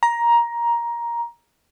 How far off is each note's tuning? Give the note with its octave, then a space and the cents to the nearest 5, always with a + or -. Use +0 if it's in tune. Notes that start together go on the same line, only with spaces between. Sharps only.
A#5 +15